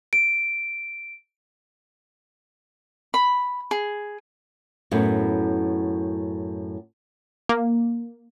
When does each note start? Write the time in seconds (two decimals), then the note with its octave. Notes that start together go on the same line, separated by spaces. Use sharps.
0.13 D7
3.14 B5
3.71 G#4
4.91 F#2 A2 B3
7.49 A#3